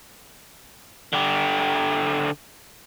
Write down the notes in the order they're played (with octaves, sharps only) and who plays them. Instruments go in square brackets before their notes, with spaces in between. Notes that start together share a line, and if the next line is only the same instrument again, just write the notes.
[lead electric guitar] D3 G4